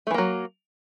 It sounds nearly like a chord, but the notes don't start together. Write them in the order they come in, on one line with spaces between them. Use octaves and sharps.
A3 E3 A#3 F#3